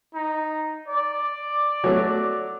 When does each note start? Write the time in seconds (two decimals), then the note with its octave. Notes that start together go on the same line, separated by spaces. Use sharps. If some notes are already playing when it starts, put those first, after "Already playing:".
0.14 D#4
0.89 D5
1.84 F#3 A3